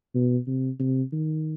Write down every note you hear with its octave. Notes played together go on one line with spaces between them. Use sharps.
B2
C3
C3
D#3